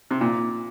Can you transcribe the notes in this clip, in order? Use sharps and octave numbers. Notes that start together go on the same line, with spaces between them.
C3
A#2